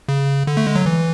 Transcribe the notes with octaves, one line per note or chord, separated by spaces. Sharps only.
C#3
D3
A3
G#3
F#3
E3